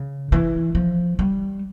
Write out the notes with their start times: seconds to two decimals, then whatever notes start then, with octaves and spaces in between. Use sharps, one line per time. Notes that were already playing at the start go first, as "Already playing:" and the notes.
Already playing: C#3
0.32 E3
0.75 F3
1.19 G3